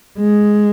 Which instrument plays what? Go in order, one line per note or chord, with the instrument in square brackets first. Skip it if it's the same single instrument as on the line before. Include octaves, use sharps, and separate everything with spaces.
[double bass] G#3